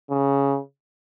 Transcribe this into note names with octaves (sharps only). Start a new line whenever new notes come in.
C#3